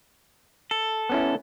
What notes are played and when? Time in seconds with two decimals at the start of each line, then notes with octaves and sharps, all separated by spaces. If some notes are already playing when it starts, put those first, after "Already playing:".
0.71 A4
1.09 B3 C#4 E4